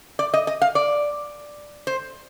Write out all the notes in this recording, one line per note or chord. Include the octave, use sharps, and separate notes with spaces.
D5
D#5
D#5
F5
D5
C5